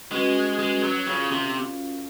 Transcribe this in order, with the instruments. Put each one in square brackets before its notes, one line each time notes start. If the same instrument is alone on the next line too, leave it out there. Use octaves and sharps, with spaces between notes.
[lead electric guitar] G#3 [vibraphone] C#4 F#4 B4
[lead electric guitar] G#3
F#3
[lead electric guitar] C#3 [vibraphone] C#4 F4 A4 D5 F5
[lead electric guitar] C3